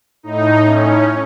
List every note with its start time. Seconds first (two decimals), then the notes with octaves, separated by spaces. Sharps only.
0.23 A2 D#4
0.66 C#4